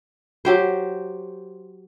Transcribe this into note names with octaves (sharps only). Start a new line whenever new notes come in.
F#3 G4 C5